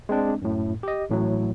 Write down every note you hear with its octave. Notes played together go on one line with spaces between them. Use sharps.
G#3 C4 D4
F#2 A2
G4 D#5
A1 A2 F#3